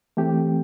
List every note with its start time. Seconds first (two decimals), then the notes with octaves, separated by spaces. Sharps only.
0.17 E3 A3 C4 G4